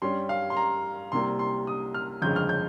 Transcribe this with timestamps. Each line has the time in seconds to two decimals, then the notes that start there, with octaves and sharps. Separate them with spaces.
0.02 G2 G3 C#4 C6
0.29 F5
0.50 C6
0.57 A#5
1.12 C2 C3 G3 A#3 C6
1.39 C6
1.67 D#6
1.94 F6
2.22 G1 F2 C#3 G#3 G6
2.36 F6
2.49 G6